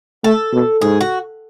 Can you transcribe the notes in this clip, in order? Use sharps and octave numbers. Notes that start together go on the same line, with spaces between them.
A3 A4
B2
G#2 G#4
F#4